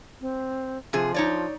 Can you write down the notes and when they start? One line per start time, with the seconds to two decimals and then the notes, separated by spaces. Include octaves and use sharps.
0.21 C4
0.93 C3 F3 G#4
1.14 D#4 C#5 D5